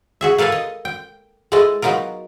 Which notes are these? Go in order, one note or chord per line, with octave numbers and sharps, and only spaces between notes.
F#4 G#4 E5
A#3 A4 B4 F5 G#5
D#5
G5
G#3 A3 E4 B4 D#5 A5
F#3 B3 D#4 F4 A#4